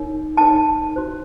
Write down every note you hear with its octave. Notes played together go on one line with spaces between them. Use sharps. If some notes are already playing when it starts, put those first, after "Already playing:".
Already playing: D#4 A#4 C#5
D#4 A#4 C#5 A5
F#4 C5